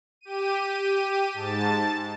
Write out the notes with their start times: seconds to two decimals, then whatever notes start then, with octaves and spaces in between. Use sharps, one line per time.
0.21 G4 D#7
1.34 G#2 A5 A6